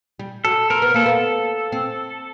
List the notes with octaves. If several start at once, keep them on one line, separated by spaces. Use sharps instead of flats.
G3
F#3 A4
C4 A#4
B3
A#3 A4
B3
C4